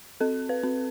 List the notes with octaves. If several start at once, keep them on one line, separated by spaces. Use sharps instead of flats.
C4 A4
B4
C4